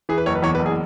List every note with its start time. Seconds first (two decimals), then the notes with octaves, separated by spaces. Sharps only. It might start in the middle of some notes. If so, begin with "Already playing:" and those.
0.09 E3 G#4
0.18 B4
0.26 F#1 C#5
0.35 B4
0.43 E2 C#5
0.55 B4
0.59 F#1
0.66 G#4